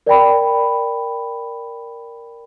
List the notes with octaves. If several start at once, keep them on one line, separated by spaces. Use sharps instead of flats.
A#4 D5 G5 B5